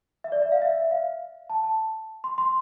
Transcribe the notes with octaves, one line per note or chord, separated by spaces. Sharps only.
E5
D5
E5
F5
E5
F5
A5
A5
C6
C6